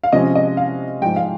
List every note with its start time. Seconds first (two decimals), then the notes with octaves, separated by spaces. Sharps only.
0.04 F5
0.13 C3 F3 G#3 C#4 D#5
0.35 D#5
0.57 F5
1.01 G#2 F3 G#3 G5
1.16 F5